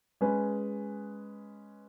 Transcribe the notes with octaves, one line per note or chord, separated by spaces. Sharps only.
G#3 C#4 G#4 B4